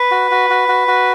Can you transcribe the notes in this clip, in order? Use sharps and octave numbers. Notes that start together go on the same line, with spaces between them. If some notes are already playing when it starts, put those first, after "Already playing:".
Already playing: B4
F#4
F#4
F#4
F#4
F#4